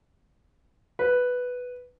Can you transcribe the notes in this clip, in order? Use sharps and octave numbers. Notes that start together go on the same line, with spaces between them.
B4